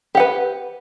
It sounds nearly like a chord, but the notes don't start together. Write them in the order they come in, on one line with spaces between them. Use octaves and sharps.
G4 F#5 B4